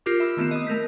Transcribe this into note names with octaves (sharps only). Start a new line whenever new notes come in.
F4 G4 A#4 D6
E5 B5 E6
D#3 A3 B3 C4 E7
D#5 D#6
A3 A#4 G6 B6